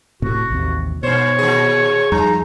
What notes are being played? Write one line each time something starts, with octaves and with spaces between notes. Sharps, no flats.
D1 A2 C3 F#4
A1 D#2 C3
G2 B2 C5 C#5
A#2 D#3 G#4
F2 G3 G#3 D#4